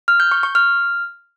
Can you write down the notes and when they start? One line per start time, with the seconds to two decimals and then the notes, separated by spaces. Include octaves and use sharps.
0.08 F6
0.20 G6
0.32 C#6
0.43 C#6
0.55 F6